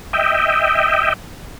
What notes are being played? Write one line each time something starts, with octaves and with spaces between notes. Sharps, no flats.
D#5 E5 G5